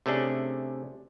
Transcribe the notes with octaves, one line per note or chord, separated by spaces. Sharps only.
C3 A3 C#4 D4 G#4